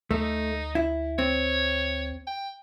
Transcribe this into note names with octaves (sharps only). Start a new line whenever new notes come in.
D2 A3 D#4
E4
C4 C#5
G5